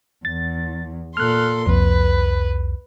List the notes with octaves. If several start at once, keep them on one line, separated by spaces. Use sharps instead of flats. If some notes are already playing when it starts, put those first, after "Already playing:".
E2 A6
A#2 A4 C6 F6 F#6
C2 F2 B4